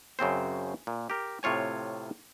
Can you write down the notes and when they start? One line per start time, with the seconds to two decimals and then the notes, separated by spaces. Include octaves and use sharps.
0.19 F#2 C#3 C4 C5
0.87 A#2
1.10 G4 A#4
1.43 A2 C3 F4 C#5 G#5